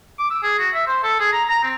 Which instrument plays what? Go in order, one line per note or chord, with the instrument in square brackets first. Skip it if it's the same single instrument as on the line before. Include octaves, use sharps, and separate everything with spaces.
[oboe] D6
E6
G#4
F#4
E5
C5
A4
G#4
A#5
A#5
C4